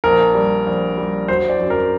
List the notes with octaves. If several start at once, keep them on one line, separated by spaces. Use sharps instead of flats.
A#1 A#4
G3
A#1
G3
F#3 C5
D5
F#2
A#4